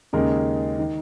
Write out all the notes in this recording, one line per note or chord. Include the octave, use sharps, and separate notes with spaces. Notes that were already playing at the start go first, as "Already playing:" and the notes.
D#2 C#3 G#3 D#4 A#4
D#3